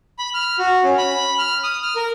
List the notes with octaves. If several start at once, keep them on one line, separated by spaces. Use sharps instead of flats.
B5
F6
F#4
C#4
B5
F6
D#6
F6
A#4